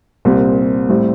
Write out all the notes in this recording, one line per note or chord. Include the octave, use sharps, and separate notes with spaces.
C2 A#2 G3 C4
A2 G3 C4